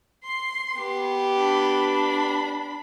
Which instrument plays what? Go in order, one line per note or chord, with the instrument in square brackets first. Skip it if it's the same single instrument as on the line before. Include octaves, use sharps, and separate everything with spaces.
[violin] C6 C7
[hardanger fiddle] B3 G4
[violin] D4 B5